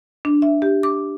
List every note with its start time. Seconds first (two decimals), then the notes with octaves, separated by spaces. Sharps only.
0.25 D4
0.42 E5
0.62 G4
0.83 D6